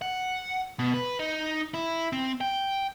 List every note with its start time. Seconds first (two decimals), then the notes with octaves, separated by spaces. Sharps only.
0.02 F#5
0.79 B2
0.94 B4
1.19 D#4
1.74 E4
2.13 C4
2.41 G5